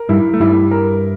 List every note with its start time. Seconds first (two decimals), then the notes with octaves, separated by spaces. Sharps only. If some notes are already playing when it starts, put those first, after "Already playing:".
Already playing: A#4
0.09 G2 G3 E4
0.34 A3
0.40 G2 G3 E4
0.71 A#4